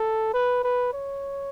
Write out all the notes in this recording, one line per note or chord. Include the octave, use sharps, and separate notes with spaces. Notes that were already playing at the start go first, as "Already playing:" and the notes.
Already playing: A4
B4
B4
C#5